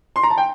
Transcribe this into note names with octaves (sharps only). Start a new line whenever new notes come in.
C6
A#5
A5
G5